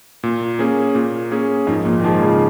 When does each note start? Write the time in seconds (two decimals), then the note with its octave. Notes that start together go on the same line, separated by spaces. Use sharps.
0.23 A#2
0.59 A#3 C#4 G#4
0.95 A#2
1.31 A#3 C#4 G#4
1.67 G#2 F3
1.85 A#2
2.00 D#3
2.04 F3 G#3 F4 G#4
2.22 C#3